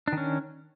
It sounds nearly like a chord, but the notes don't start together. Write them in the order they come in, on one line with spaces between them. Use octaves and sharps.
D4 D#3 C#4